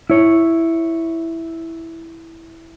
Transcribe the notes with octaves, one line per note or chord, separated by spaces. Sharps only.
E4 C#5